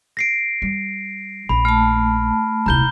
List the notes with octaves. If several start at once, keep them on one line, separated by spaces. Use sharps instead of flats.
A#6 C7 D7
G3
A#1 B5
A3 A5 F6
D#1 C2 A#5 G6 G7